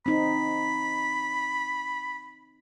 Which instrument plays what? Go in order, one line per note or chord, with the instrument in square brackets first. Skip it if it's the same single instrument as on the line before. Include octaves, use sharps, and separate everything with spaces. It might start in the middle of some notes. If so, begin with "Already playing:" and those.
[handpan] C4 D#4 [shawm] B5